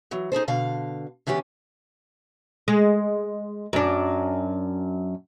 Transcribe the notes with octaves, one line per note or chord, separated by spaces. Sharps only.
E3 F#3
D#4 G#4 A4 C5
B2 D3 F5
D3 E3 B3 C#4 G4
G#3
F#2 D4